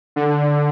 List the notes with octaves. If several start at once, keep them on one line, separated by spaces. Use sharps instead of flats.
D3